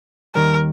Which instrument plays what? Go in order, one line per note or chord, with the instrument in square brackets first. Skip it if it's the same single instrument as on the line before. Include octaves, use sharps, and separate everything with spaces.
[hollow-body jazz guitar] D#2 D#3 G3 [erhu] A#4